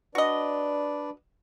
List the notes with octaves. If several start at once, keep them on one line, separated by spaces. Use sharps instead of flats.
D4 F#4 B4 D5 D#5